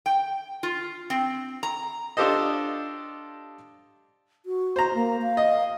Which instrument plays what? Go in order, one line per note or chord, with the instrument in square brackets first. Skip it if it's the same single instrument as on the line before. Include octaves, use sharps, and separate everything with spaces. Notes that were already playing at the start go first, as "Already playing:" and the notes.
[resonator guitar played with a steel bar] G5
F4
C4
A#5
[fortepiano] D4 F4 G4 A4 C5 D#5
[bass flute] F#4
[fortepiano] C5 A#5
[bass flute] A#3
F5
[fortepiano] D#5